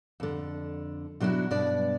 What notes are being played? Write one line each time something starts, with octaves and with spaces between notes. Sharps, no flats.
F2 D3
B2 F#3 D4 E4 F#4
G2 B2 D4 D5